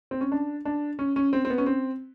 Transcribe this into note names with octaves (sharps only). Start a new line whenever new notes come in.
C4
C#4
D4
D4
C#4
C#4
C4
C4
B3
C#4
C4